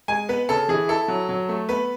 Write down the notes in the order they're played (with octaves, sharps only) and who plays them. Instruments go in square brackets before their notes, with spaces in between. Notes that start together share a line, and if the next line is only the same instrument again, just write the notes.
[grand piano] G#3 G#5
B3 B4
C#3 A4
E3 G#4
E4 A4
F#3
F#3
A3
B3 B4